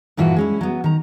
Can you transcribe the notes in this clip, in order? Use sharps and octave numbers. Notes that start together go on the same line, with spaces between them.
G2 A#2 E3 F4 F#4 A4
G#3 C#4 E4
F#3 B3
D#3 A#5